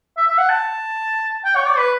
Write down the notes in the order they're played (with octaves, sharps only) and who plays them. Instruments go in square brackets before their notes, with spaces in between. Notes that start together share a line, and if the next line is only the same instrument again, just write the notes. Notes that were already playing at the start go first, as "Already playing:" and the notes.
[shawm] E5
E5
F#5
A5
G5
C#5
D5
B4